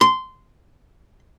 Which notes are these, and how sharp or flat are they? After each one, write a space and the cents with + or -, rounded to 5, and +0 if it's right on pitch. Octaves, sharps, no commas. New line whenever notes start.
C6 -15